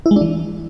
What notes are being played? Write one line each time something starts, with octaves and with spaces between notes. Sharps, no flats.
E4
G#3
D4
E3